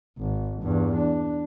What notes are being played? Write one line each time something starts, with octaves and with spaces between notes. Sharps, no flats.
G#1
E2 G2
D4